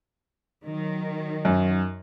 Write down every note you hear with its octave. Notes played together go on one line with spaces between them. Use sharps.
D#3 F#3
F#2